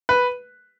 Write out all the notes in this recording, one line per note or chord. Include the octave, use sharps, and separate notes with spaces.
B4